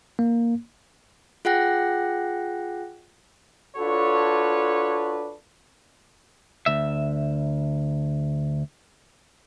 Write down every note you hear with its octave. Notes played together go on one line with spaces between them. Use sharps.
A#3
F4 G#4 F#5 G5 F#6 A#6
D4 F4 F#4 A4 B4 C#5
D2 E5